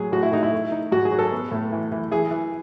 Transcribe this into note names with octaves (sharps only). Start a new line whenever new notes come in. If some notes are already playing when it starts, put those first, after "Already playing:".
Already playing: A2 F#3 G#4
A2 F#4
E4
A2 D#4
E4
A3
D#4
G#2 F#4
G#4
F#3
A4
B3
A2
E3
E3
E3 G#4
E3